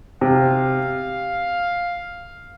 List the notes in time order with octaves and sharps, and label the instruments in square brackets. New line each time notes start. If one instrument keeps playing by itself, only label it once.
[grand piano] C3 [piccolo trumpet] F5